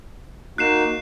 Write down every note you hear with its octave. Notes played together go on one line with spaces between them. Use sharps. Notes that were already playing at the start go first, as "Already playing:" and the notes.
A#3 D#4 F#4 F#6 C7 E7